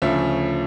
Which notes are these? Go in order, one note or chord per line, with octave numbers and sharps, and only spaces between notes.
D2 C#3 F3 C#4 E5